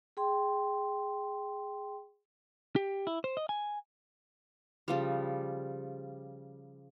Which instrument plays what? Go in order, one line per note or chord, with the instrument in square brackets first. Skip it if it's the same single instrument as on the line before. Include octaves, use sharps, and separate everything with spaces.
[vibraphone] G#4 G5 C6
[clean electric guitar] G4
E4
C5
D#5
G#5
[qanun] C#3 F3 G3